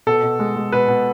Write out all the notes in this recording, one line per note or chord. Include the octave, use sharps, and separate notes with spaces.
B2 A4
B2
G#3
G#3
B2 B4
B2